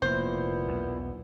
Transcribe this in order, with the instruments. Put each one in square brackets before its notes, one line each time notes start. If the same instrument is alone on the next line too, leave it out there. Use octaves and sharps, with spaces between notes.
[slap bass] F1 A#3 [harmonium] A#2 E4 [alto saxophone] B3 [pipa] C5
[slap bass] B1 E2